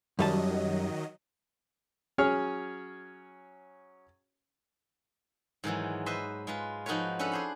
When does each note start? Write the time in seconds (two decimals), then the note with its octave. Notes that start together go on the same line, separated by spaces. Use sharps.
0.19 F#2 D#3 F#3 G3 D#5 A5
2.18 F#3 C#4 G#4 C#5 F6
5.64 G#2 D#3 E3 F#3
6.06 B4 C5 D#5 E5
6.47 G#3 F4 B4
6.86 F3 D#4 F#4 A#4 B4 C#5
7.19 C#4 D4 A4 B4
7.32 G#4 C5 F#5